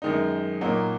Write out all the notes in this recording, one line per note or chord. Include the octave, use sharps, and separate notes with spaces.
F#2 D#3 G#3 D#4
A#2 F#3 A#3 D#4